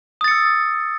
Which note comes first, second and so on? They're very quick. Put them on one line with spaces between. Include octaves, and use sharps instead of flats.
D#6 A6 C#7 E6